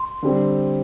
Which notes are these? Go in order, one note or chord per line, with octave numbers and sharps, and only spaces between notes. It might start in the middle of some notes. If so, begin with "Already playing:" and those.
Already playing: C6
D3 G3 C4